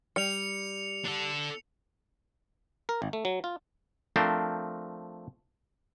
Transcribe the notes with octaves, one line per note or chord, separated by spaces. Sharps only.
G3 C#7 F7
D4 A4
A#4
G#1
A3
F#3
F4
F3 A3 C4 D4 A#4 C5